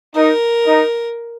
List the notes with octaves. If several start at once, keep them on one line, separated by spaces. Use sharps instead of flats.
D#4 A#4
D#4